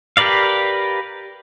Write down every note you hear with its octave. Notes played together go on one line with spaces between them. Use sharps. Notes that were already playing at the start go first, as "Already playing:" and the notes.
G4 A#4 B4 D5 F5